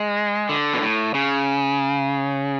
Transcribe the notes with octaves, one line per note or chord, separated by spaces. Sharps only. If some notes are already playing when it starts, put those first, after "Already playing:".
Already playing: G#3
D3
B2
A2
C#3